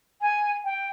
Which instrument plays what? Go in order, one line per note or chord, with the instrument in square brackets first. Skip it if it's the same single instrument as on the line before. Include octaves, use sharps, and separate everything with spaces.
[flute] G#5
G5